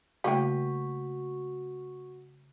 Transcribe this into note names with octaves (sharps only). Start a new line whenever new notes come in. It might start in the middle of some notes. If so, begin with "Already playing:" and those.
C#3 G3 A3 A#3 E4 F#4 G5